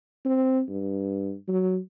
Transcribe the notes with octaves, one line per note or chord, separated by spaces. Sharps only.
C4
G2
F#3